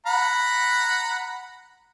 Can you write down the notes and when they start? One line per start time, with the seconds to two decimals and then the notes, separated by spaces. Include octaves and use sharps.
0.06 F#5 A#5 B5